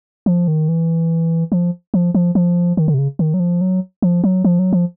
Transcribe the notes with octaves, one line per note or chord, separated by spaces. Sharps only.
F3
D#3
E3
F3
F3
F3
F3
D#3
D3
C3
C#3
D#3
F#3
F3
F#3
F3
F#3
F3
F#3
F3